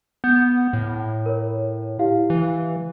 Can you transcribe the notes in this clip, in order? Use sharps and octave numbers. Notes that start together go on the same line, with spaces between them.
B3 G6
A2
A#4 C#5
E4 G4 F5
E3